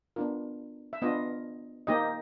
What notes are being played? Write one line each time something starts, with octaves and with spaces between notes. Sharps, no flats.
B3 D4 F4 A#4
E5
B3 D4 F4 D#5
A#3 D#4 G4 D#5